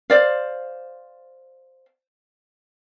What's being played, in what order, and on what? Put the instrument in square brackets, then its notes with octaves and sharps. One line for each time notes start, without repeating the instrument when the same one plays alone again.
[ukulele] C5 D5 F5